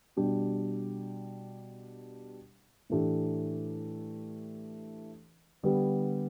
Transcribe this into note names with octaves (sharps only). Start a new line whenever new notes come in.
B2 G3 D4 G4
A2 E3 A3 D4 G4
D3 G3 B3 G4